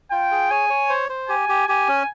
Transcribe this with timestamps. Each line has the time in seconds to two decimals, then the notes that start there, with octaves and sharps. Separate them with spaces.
0.11 F4 G5
0.31 G#4
0.51 C#5 G#5
0.70 C#5
0.89 C5
1.09 C5
1.29 G4 G#5
1.49 G4
1.68 G4 G#5
1.88 C#4